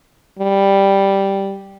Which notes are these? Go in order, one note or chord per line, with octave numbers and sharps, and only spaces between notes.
G3